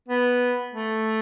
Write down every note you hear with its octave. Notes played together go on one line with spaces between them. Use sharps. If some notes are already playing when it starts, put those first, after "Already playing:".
B3
A3